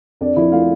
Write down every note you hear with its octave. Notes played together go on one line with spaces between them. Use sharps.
F2 D4 D5
F3 E4 E5
A3 F4 F5